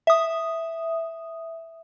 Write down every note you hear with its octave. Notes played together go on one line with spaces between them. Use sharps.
E5 D#6